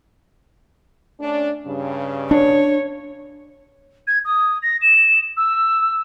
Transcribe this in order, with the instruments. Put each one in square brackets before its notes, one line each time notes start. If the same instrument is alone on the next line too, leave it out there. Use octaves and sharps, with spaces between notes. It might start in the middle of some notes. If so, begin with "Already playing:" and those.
[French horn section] A3 C#4 D4
G2 C#3
[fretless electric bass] D4 [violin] C#5
[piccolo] G#6
D#6
A#6
E7
E6